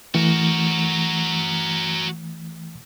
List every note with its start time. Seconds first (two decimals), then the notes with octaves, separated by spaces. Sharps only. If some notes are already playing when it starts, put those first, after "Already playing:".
0.15 E3 A3 F#4 A#4